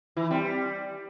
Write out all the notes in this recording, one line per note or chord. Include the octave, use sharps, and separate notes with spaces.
E3 E4
G3 C4